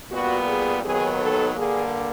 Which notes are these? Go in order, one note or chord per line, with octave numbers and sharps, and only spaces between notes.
A#2 G3 B3 F#4
G#4
D#2 D#3 F#3 B3 G#4
A4
G2 D3 G3 A#3 G#4